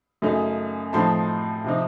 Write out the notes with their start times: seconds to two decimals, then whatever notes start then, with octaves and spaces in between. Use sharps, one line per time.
0.22 F#2 C#3 A3 D#4
0.93 A2 F3 C4 D#4 A5 C6
1.64 C3 F3 C4 D#4